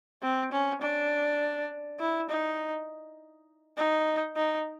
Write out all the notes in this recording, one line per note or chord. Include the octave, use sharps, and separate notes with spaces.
C4
C#4
D4
E4
D#4
D#4
D#4